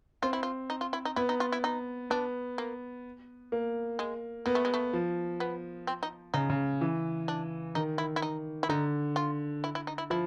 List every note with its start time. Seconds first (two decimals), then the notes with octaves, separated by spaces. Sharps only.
0.23 C4 F4
0.33 E4
0.43 F4
0.70 D#4
0.81 F4
0.93 E4
1.05 D#4
1.16 B3 E4
1.29 D#4
1.40 F4
1.52 E4
1.64 D#4
2.10 B3 D4
2.58 A#3
3.52 A#3
3.99 G#3
4.46 A#3 B3
4.55 A3
4.65 G#3
4.74 A3
4.93 F3
5.40 B3
5.87 C4
6.03 D#4
6.34 C#3 D#4
6.50 C#3
6.81 E3
7.28 D4
7.75 D#3 D#4
7.98 E4
8.16 E4
8.22 D#4
8.63 E4
8.69 D3 D#4
9.16 F4
9.64 E4
9.75 E4
9.87 D#4
9.98 E4
10.10 F3 E4